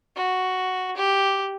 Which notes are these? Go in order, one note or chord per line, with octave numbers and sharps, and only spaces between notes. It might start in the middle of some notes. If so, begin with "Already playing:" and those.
F#4
G4